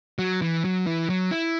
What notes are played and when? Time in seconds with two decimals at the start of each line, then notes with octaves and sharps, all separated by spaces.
0.19 F#3
0.42 E3
0.65 F#3
0.87 E3
1.10 F#3
1.31 E4